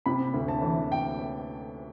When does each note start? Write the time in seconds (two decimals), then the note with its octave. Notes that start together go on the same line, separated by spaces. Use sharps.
0.06 C3 B5
0.34 D2
0.48 A5
0.62 E3
0.92 G5